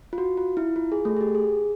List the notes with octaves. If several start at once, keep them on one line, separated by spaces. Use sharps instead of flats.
F4
F#4
F4
E4
F4
G#4
A3 A4
G#4
G4
G#4